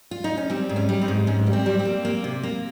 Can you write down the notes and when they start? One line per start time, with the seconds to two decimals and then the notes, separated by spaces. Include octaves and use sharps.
0.11 F4
0.24 D#4
0.37 C#4
0.50 G3 C4
0.69 G#2
0.76 C#4
0.89 G3
1.01 C4 D#4
1.08 G#2
1.27 G#2 C#4
1.47 G3
1.53 C4
1.66 G3
1.79 C4
1.85 A#3
2.05 A#3
2.24 C3
2.43 A#3